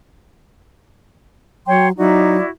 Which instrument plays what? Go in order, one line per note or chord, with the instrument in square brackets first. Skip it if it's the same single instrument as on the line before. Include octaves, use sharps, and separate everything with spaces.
[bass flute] F#3 [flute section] C#5 C6 [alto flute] G5
[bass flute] F#3 [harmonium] D#4 [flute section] E4 F#4 [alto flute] D5